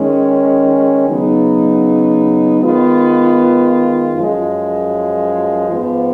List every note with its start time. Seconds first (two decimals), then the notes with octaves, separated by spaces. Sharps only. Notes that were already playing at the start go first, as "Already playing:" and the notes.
Already playing: D#3 G#3 C#4
1.08 C#3 F#3 B3 D#4
2.62 D#3 G#3 B3 F4
4.15 F#2 F3 G#3
5.68 G#2 F3 B3